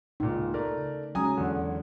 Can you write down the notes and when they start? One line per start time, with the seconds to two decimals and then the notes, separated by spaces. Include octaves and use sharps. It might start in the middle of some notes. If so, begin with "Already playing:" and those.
0.20 C#2 A#2 D#4
0.54 A3 A#4 D5
0.78 C#3
1.15 F#3 G#3 C#4 G#5 A#5 D#6
1.38 E2 D3